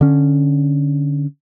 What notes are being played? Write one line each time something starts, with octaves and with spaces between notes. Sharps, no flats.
D3 C#4